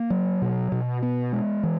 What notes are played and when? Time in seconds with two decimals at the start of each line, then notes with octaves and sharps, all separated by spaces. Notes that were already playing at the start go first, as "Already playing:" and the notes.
Already playing: A#3
0.10 F#3
0.42 B2
0.72 B2
1.03 B3
1.33 G#3
1.63 E3